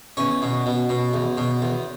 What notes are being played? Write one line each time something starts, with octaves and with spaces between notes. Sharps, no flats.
E2 C#4
B2
B2
B2
E2
B2
E2